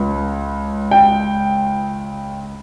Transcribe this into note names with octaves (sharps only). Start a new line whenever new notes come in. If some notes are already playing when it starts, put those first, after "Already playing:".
Already playing: C#2
G5